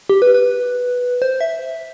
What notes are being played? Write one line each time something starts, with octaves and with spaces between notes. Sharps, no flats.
G4
B4
B4
C5
E5